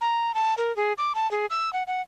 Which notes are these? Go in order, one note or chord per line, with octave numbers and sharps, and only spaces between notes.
A#5
A5
A#4
G#4
D6
A5
G#4
E6
F#5
F#5